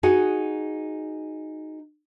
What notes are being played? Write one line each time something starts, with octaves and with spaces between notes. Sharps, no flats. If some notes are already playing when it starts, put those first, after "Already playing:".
D#4 F#4 G#4 F#5